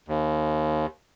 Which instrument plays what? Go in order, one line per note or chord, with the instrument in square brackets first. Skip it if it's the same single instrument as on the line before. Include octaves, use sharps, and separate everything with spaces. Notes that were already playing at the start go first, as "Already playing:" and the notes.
[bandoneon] D#2